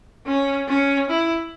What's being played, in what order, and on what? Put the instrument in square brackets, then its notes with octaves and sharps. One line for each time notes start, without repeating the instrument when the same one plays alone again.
[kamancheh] C#4
C#4
E4